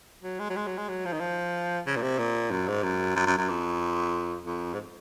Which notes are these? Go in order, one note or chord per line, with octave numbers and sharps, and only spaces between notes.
F#3
G#3
F#3
G#3
F#3
G#3
F#3
F3
D#3
F3
C#3
A#2
C3
A#2
F#2
G#2
F#2
F#2
F#2
F#2
F2
F2
G#2